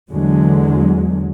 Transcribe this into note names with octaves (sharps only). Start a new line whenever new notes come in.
E2 D3 F#3 G#3